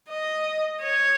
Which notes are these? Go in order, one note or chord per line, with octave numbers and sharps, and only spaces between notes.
D#5
C#5